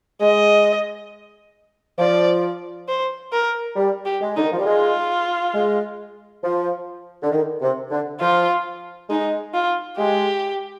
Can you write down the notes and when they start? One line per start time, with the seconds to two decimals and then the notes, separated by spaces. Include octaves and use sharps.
0.20 G#3 D#5
1.99 F3 D5
2.88 C5
3.32 A#4
3.76 G3
4.05 G4
4.21 G#3
4.36 D3 D#4
4.44 D#3
4.51 F3
4.58 G3
4.65 G#3 F4
5.54 G#3
6.43 F3
7.23 D3
7.32 D#3
7.62 C3
7.91 D3
8.20 F3 F4
9.10 G#3 D#4
9.54 F4
9.98 G#3 G4